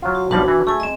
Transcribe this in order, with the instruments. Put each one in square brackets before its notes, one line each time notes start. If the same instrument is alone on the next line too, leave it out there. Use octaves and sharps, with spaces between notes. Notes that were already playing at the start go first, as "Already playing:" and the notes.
[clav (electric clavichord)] F#3 F4
[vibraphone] F#4
[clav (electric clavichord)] B1 F3 G3 [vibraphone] D4 F#4 B4
[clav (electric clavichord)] E3
[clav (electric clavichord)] A3 [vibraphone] G#4 G#5
[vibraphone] C4 D#5